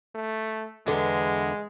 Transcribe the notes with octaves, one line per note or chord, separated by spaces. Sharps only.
A3
E2 D3 G#3 B3